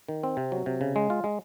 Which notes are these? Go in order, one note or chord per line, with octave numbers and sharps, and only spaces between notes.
D#3
C4
C3
F#3
C3
C#3
G#3
F4
G#3